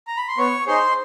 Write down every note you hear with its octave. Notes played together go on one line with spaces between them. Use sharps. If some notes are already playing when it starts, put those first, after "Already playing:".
A#5
B5
C6
B3 C#5 C#6
D#4 G#4 C5 C6